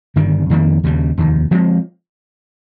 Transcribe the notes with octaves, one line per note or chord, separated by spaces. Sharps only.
G1 G2 D#3 G3
F2 D#3 G3 A#3
D#2 C#3 G3
F1 D#2 D#3
F3 G#3 C4